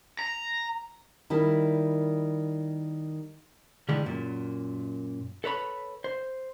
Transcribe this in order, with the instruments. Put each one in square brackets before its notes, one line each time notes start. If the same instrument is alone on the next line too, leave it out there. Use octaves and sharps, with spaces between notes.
[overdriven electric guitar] A#5
[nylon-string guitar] D#3 G3 E4
[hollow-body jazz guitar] D3 E3 G3 G#3
F#2 A#2
A4 B4 C#5 B5
C5